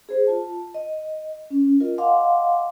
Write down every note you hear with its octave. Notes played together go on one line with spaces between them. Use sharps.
G#4 C5
F4 A5
D#5
C#4
F4 A#4 D#5
D#5 F5 F#5 G#5 C6 D6